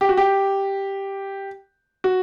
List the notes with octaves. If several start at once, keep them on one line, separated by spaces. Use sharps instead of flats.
G4
F#4
G4
F#4